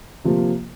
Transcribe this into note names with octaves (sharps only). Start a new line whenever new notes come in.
C3 F3 A#3